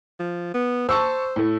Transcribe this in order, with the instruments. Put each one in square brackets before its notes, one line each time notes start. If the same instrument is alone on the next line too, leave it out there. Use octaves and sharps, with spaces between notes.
[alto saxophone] F3
B3
[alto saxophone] C5 [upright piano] A5 C#6 E6
[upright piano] A2 A3